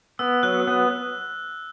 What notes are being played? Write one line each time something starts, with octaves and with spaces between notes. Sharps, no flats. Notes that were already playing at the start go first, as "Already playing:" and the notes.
B3 E6
F#3 F#6
B3